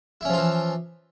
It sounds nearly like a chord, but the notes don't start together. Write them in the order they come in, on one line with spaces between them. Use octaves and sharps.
E4 C#4 F3 F4 E3